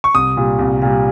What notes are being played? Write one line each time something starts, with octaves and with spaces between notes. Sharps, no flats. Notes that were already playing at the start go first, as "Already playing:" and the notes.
C#6
C2 D#6
A#2 G3
C2
A#2 G3